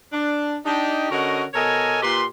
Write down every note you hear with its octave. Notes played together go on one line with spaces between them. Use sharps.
D4
D4 D#4 G4
D3 C#4 F#4 A#4 D#5 F#5
B2 A4 A#4 C#5 D#5 G#5
A#2 A#3 G4 B4 C6